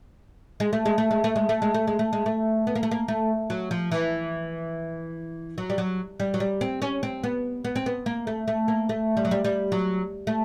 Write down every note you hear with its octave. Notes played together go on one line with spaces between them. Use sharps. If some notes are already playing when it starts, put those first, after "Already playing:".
G#3
A3
G#3
A3
G#3
A3
G#3
A3
G#3
A3
G#3
A3
G#3
A3
B3
A#3
A3
A#3
A3
F#3
F3
E3
F#3
G3
F#3
G3
F#3
G3
C4
C#4
C4
B3
B3
C4
B3
A#3
A3
A3
A#3
A3
G3
F#3
G3
G3
F#3
A3